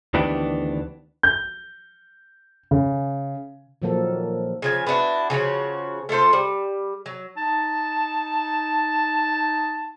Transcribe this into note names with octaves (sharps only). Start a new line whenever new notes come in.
D2 D#3 E3 B3 D4 G4
G6
C#3
A#2 D#3 F3 F#3 A#3 A4
C#3 F3 G#5
B3 D4 E4 F#4
C#3 F3 F#4 C#5
A3 F4 A4 C5
G3
F#3
D#4 A5